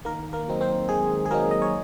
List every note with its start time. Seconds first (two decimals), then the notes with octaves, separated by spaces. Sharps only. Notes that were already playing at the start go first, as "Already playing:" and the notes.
0.05 D#3 A#3 A#4
0.33 A#3 A#4
0.48 F#3 C4 D#4
0.61 C4 C5
0.89 D#3 G#3 G#4
1.26 G#4
1.31 F#3 A#3 C4 D#4 A#4
1.51 D#5
1.62 C#5